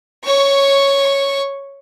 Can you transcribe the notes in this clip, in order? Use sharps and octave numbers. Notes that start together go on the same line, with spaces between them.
C#5 C#6